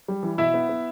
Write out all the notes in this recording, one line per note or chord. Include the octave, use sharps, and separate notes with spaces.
G3
E3
B2 E4 E5
B3
B3